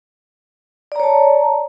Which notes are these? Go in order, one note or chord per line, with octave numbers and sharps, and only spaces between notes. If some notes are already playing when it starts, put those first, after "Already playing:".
C#5 D5 A5 A#5